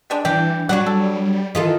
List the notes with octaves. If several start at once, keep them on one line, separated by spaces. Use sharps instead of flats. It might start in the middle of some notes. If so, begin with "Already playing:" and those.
G3 G#3 D4
E3 D4 G4
F#3 G3 D4 F#4 F#5
G3 A4
D#3 E3 F4 A4